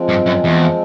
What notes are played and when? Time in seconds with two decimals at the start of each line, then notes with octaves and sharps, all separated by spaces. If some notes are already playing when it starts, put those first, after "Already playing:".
Already playing: F3 G#3 C4
0.09 G2
0.26 F#2
0.44 E2